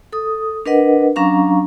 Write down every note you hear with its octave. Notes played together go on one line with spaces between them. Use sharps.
A4 D#6
D4 A#4 B4 D#5 F#5
F#3 C#4 D4 F5 A#5 C#6